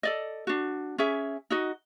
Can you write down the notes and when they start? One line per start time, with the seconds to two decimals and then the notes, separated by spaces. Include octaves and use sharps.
0.03 A4 D5 D#5
0.47 D4 F#4
0.98 C#4 G#4 E5
1.50 D#4 F#4 D#5